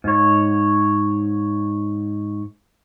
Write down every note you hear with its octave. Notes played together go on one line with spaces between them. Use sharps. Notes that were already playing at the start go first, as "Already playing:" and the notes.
G#2 C#5